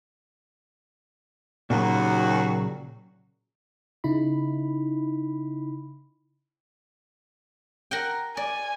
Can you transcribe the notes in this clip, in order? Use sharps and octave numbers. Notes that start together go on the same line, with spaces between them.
D#2 A#2 C#3 F#3 F#4
C#3 D#4 E4 B5
A#4 F#5 G5
D5 G#5